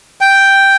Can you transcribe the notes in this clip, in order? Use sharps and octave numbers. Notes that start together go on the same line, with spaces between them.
G5